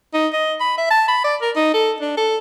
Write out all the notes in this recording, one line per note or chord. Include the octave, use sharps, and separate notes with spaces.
D#4
D#5
B5
E5
A5
B5
D5
A#4
D#4
A4
D4
A4